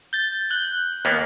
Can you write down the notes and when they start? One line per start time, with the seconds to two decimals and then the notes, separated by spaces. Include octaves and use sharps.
0.13 G6 A6
0.51 F#6 G6
1.05 D#2 A#3 B3